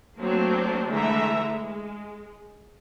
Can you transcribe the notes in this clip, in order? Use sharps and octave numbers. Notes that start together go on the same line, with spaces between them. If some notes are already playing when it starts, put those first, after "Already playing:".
F#3 A3 A#3 C4 D4
D3 E3 G#3 A3 E5 A#5
G#3